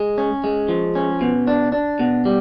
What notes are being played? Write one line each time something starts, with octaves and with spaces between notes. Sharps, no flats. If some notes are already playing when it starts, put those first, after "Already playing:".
Already playing: G#3
C#4
G#3
F3
C#4
B2
D4
D4
B2
G3